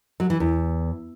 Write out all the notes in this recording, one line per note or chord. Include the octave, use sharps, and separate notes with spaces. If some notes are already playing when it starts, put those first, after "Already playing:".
F#3
E3
E2